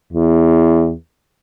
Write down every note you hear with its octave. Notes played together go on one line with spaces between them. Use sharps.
E2